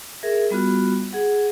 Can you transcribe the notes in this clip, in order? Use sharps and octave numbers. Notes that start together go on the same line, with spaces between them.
G#4 A#4 E5
G3 B3 F4 F#4
G#4 F#5